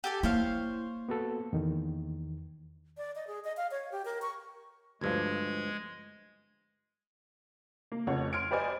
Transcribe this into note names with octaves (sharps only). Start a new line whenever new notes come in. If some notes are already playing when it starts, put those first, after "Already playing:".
G4 A4 G#5
A#3 E4 C5 C#5 F5
B3 F#4 A4
E2 D#3
D5
D#5
G#4
D#5
F5
C#5
G4
A#4
C#6
D2 G2 F3 G#3 G#6
A#3
F1 F2 C#3 C#5 F#5
C6 F6 G#6 D7
G4 B4 C5 D5 D#5 G#5